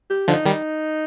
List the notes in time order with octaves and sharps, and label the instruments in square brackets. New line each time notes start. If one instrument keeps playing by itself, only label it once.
[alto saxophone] G4
[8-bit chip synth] D3 F3 [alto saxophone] D#4
[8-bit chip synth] D#3 G3